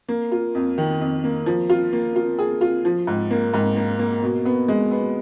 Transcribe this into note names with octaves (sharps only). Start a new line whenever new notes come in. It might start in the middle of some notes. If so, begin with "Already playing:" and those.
A#3
F4
F2
D#3
F2
A#3
F3
F4
A#3
F4
G#4
F4
F3
G#2
A#3
G#2
A#3
A#3
B2
B3
G#3
B3